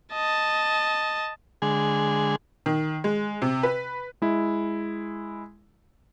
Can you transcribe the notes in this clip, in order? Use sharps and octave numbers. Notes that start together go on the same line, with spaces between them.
D#5 A5
D3 G#3 G#4
D#3
G#3
C3
B4
G#3 E4